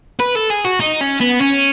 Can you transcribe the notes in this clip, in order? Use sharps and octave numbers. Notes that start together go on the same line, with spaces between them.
B4
A4
G#4
F#4
D#4
C#4
B3
C#4